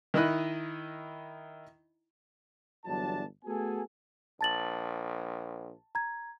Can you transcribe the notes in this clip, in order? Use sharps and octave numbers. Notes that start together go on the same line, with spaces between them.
D#3 D#4 E4 D#5 B5 F#6
G1 E2 F#3 D4 A5
A3 B3 F#4 G#4 A4 G#5
A#1 A5 A6 F#7
A#5 G#6